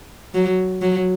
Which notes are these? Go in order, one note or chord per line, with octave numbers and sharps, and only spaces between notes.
F#3
F#3